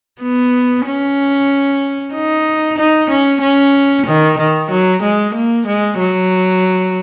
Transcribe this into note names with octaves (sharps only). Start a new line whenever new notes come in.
B3
C#4
D#4
D#4
C#4
C#4
D#3
D#3
F#3
G#3
A#3
G#3
F#3